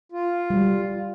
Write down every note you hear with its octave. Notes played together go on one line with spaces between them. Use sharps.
F4
G3